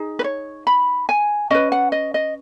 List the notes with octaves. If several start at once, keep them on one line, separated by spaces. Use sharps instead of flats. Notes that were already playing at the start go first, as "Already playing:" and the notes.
Already playing: D#4 G#4
B4
C#5
B5
G#5
C#4 B4 D#5
F#5
D#5
D#5